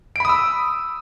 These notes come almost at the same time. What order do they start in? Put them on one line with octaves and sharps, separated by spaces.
D7 B5 D#6 E6